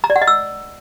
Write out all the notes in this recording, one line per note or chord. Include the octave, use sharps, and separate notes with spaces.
A#5
D5
F#5
D#5
E6